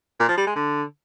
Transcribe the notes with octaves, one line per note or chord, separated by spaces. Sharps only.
A#2
F3
G3
G#3
D3